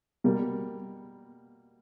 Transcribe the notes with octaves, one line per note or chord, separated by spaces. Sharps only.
B2 G3 A#3